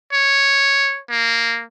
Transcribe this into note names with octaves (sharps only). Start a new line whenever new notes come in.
C#5
A#3